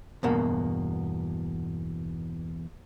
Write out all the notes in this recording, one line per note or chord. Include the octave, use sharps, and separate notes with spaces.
E2 G2 B2 A#3